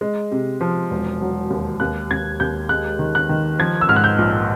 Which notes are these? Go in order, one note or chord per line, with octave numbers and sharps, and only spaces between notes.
G#3
C3
F3
E1
F#3
D#2
D#2 F#6
D#2 G#6
D#2 G6
G#3 F#6
D#3
F#6
D#3
F3 G#6
E6
G#2 F6
F#6
G6
A#1